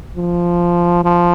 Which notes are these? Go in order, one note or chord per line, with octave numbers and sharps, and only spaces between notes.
F3
F3